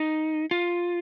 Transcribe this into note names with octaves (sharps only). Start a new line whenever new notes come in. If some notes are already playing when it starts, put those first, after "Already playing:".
Already playing: D#4
F4